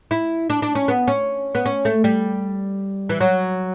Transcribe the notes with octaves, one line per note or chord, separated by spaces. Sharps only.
E4
D4
D4
C#4
B3
C#4
B3
C#4
A3
G3
E3
F#3